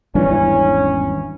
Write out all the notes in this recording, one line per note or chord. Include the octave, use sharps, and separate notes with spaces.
G#1 E2 E3 G3 C#4 D4 E4